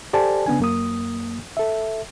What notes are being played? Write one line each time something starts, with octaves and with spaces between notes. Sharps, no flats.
G4 A4 C5 D5 G#5 A5
C#3 B3 D4 G#5
F#2 A#3 D#6
A4 E5